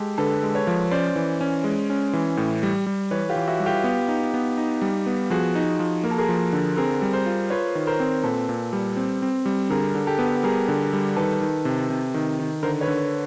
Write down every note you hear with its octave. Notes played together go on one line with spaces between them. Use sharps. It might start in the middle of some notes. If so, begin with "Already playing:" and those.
Already playing: G#3 G4 A4
D3 A4 B4
G#3
B4 C#5
F3
C#4 C5 D5
E3
C#4
G#3
C#4
E3
A2
G3
G3
E3 B4 C#5
F4 G4
E3
E4 F#4
G3
F4 G4
B3
D#4
B3
D#4
G3
B3
F3 F#4 G#4
D#4
F3
A#3 A#4
A4
G#4 A#4
F3
D3
C4 G#4 A#4
G3
A#4 C5
F4
F4 B4 C#5
D#3
A#4 C5
C4
A#2 A4 B4
A#2
G3
C4
C4
G3
D3 G#4 A#4
D3
G4 A4
B3
G3 G#4 A#4
D3
G3
D#3 A4 B4
D#3
C3
C3
D#3
D#3
D3 A#4 C5
B4 C#5
D3